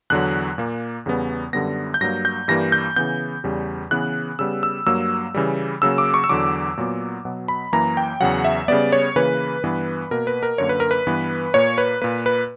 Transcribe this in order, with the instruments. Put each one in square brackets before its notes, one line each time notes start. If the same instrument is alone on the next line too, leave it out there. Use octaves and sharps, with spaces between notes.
[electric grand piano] E2 D3 F#3 F#6
A#2 A#3
E2 C#3 G3 B3
F#2 D3 G3 B3 A#6
G6
G2 F#3 A#3 A#6
G6
G2 E3 G3 A#3 A#6
G6
C#3 E3 B3 G6
E2 C#3 G3
C#3 E3 B3 F#6
C#3 G3 B3 E6
E6
G2 F#3 A#3 E6
C#3 E3 G3
C#3 F#3 A#3 E6
D6
C#6
E6
E2 D3 F#3 D6
A#2 F#3 B3
B2 F#3 B3
B5
F#2 E3 A#3 A#5
G5
E2 C#3 F#3 F#5
E5
C#3 G3 B3 D5
C#5
C#3 E3 A#3 B4
G2 E3 B3
B2 A#3 A#4
B4
A#4
F#2 D3 A#3 C#5
B4
A#4
B4
G2 E3 B3
A#2 A#3 C#5
B4
A#2 A#3 B4
B4